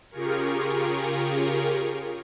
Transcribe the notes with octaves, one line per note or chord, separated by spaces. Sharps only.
C#3 F4 G4 G#4 A#4 C#6